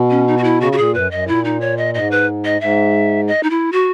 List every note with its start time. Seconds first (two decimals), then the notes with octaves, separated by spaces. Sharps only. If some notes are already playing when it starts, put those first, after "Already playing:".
Already playing: B2
0.10 C#4
0.28 D#4
0.38 F#4
0.44 E4
0.61 C#3 F#4
0.72 F#4
0.78 A#2 G#4
0.94 F#2 B4
1.11 F#2 D#5
1.28 A#2 E4
1.45 D#4
1.61 C#5
1.78 D#5
1.94 G#2 D#5
2.11 B4
2.45 D#5
2.61 G#2 E5
3.28 D#5
3.43 D#4
3.50 E4
3.72 F#4